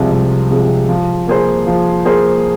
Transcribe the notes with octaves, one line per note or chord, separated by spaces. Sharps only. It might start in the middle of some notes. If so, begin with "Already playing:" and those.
Already playing: C2 C3 F3 G#3
C2
C3 F3 G#3
F3
A#3 G#4 C5
F3
A#3 G#4 C5